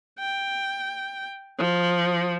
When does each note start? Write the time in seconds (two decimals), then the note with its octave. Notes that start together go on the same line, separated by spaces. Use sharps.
0.19 G5
1.58 F3